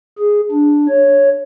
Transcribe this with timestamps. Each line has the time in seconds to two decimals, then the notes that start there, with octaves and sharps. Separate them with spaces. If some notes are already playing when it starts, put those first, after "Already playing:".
0.19 G#4
0.52 D4
0.89 C#5